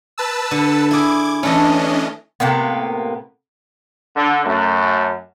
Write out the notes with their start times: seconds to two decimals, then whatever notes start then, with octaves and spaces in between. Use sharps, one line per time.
0.18 B4 A5 E6
0.51 D3
0.91 E4 G#4 D6 G#6
1.43 E3 A3 C#4 D4 D#5
2.40 A2 C3 A#3 B3
4.15 D3
4.45 F#2 A3